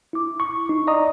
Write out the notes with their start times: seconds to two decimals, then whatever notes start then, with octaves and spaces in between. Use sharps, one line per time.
0.13 E4 D6
0.40 C#6
0.69 D#4
0.87 D5 D#5 A#5 D#6